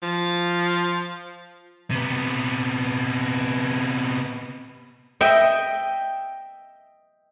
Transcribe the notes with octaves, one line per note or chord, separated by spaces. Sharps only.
F3
C3 B3
D#5 E5 G5